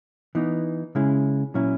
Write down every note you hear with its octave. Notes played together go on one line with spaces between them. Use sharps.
E3 B3 D#4
C#3 G#3 C#4 E4
A#2 F#3 C#4 E4